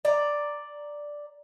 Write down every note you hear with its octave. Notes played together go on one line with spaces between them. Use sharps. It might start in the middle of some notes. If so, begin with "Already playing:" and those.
D5 A#5